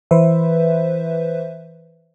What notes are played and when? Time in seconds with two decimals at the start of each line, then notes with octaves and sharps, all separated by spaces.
0.11 E3 B4 C5 E5